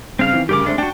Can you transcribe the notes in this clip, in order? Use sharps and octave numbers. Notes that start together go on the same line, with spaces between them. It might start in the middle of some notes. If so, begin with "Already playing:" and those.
G2 C#3 C4 F5 F6
D#3 E3
D2 G2 C#3 G4 A#4 D6
G#3 A3 C4 D4
D4 F#4 G5 A5